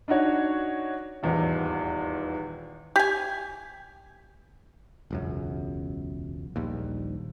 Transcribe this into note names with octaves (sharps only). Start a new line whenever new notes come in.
D4 D#4 F#4 C#5
D#1 E2 G#2 D#4
G4 G#5
E1 C#2 F#2
D#1 A#1 D#2